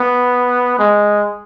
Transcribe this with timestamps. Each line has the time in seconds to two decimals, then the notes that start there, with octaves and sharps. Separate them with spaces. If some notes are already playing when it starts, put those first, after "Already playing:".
Already playing: B3
0.79 G#3